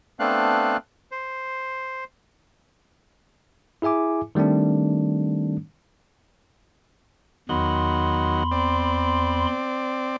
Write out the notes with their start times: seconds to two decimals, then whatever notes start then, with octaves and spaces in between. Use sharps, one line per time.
0.20 A3 B3 C4 D4 F5 F#6
1.12 C5
3.82 E4 G#4 E5 G#5 D6
4.35 D#3 G3 A3 C4 D4
7.49 E2 D#3 F#3 B5 C6
8.52 C4 D5